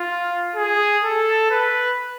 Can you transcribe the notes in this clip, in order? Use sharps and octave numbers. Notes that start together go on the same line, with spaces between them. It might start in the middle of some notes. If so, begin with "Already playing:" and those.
Already playing: F4
G#4
A4
B4